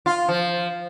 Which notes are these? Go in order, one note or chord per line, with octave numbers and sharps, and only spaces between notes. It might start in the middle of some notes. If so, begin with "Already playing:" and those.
F4
F3